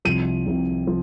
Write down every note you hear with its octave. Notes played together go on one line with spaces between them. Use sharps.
C2 C3 F3 D#7
C2 C3 F3
F3